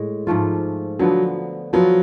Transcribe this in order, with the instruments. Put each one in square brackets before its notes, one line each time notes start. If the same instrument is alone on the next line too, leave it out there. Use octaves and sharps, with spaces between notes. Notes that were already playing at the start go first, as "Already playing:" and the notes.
Already playing: [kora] A2 G#3
G#2 F3 A3 F4
[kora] D3 F3 B3 [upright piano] F#3
[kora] F3 B3 F4 [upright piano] F#3